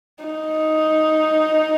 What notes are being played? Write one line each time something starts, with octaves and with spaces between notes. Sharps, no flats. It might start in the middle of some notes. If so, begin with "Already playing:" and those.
D#4